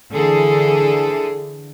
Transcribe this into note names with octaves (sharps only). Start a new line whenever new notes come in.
D3 E3 G#4 A4